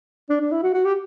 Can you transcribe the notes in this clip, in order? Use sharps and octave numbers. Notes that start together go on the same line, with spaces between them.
D4
D4
E4
F#4
F#4
G4